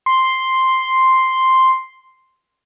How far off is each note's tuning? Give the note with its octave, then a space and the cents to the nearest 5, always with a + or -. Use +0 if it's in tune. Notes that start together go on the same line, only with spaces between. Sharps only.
C6 +0